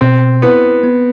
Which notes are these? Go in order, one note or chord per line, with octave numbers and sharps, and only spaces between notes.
B2 C4
B3 E4
B3